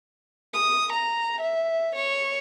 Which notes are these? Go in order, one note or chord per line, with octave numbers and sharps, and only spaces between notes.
D#6
A#5
E5
C#5